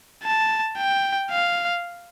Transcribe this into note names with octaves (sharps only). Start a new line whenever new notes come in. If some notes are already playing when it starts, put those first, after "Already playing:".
A5
G5
F5